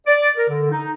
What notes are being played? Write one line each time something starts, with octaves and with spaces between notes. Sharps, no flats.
D5
A#4
D3
D#4